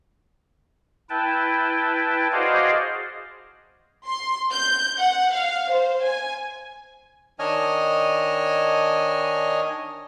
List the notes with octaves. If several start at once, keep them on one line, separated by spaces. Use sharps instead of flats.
E4 B4 G5 A5
F#4 G#4 C5 D5 D#5 F5
C6
G6
F#5
F5
C5
G#5
D#3 D4 C#5 D#5 G#5 F6